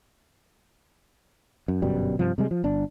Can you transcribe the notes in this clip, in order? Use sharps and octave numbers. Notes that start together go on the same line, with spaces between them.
F#2
G1 F#2 B2 G3
G2 C3 F3
C3 G3 G#3
F3
G1 D4